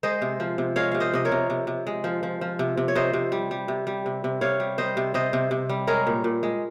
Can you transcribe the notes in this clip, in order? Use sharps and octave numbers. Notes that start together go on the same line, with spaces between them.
G#3 C5 D#5
C3
F3
C3
G#3 C#5 F5
C3 F5
C5 D#5
C3 D#5
A#4 C#5
C3
C3
C3
G#3
F3
F3
F3
C3
C3
C#5
C3 C5 D#5
C3
G3
G3
C3
G3
C3
C3
C3 C#5 F5
G3
G3 C5 D#5
C3
C3 C5 D#5
C3
C3
G3
G#3 A#4 C#5
A#2
A#2
G#3